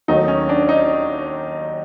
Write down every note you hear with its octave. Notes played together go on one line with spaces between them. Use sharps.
D#2 D#3 F#3 A3 D#4
C#4
D4
D#4